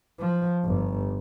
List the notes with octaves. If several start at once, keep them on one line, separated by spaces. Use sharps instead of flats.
F3
G1